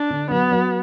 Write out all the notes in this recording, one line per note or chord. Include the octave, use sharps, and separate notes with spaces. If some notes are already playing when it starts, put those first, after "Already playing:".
Already playing: D4
D3
F#3 B3
F#3